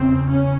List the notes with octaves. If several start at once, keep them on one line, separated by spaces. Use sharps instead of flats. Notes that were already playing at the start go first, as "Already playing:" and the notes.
Already playing: E2 C#3 C4
C#4